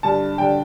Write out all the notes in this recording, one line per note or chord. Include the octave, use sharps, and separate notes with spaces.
G2 D3 A5
G2 D3 G5